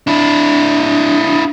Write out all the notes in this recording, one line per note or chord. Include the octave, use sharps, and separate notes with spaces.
D4 E4